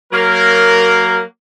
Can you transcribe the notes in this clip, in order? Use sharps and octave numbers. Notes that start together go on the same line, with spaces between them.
F#3 A#3 A#4